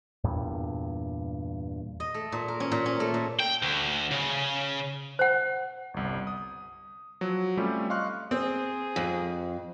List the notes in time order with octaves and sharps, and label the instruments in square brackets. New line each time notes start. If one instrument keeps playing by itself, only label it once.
[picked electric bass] E2 G2 A#2
[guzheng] D#5
A3
A#2
A#4
C#4
A#2
C#4
A3
A#2
[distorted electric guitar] G5
D2
C#3
[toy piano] C5 F#5
[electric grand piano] G1 C2
D#6
F3 F#3
G3 A3 C4 C#4 F4 G4
D#5 F5 C6 C#6 F6 F#6
[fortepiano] C4 [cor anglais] G#4
[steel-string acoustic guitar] F2